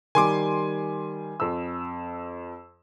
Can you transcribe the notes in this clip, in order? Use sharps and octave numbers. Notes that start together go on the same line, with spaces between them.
D#3 G3 G#5 C6 D6
F2 E6